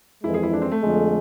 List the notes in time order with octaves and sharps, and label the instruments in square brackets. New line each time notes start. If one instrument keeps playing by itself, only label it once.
[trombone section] F2 E3 G#3 [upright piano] E4
[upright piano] G#4
E4
D4
C4
A3
[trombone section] F2 D3 F3 G#3